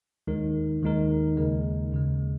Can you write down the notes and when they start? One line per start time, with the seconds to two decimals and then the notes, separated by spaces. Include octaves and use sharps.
0.27 D#2 D#3 G#3 D#4 A#4
0.82 D#2 D#3 G#3 D#4 A#4
1.37 D#2 C#3 G#3
1.92 D#2 C#3 G#3